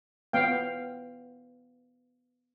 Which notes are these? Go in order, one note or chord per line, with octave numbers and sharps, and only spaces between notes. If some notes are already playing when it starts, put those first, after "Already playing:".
B3 F5 G5